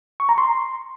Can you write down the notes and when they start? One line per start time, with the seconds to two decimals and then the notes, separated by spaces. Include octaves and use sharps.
0.20 C#6
0.29 A#5
0.38 C6